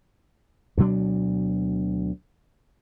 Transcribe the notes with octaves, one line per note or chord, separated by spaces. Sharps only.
D2 B2 F#3 D4